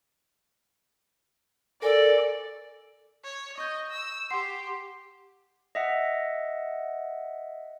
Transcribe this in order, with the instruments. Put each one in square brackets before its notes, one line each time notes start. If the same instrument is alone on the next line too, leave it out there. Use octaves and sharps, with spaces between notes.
[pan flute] A4 [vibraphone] A#4 G#5 [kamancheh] D5
[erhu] C#5
[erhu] D#5 [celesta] C#6 G6
[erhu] E6
[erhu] G4 [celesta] F#5 C6 C7
[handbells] D#5 E5 F#5